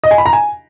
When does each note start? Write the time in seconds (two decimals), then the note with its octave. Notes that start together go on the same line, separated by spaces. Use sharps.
0.04 D#5
0.11 G#5
0.18 B5
0.26 A#5
0.33 G#5